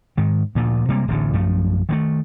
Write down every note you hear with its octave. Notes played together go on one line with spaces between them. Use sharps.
G#2 D#3
D2 A#2 F3
C3 G3 G#3 A#3
D1 A1 D2 D3
A#1 F#2 F3 A3
D#3 F3 A3